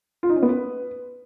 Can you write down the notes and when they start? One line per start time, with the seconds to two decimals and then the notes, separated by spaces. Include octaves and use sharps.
0.23 F4
0.29 D#4
0.36 C#4
0.43 B3
0.49 B4